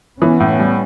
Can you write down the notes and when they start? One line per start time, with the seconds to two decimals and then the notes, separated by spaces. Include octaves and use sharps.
0.21 E3 B3 C#4
0.40 A2
0.59 G3